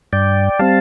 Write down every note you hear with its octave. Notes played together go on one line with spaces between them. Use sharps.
G2 D5 G5
G3 C4 F5 A5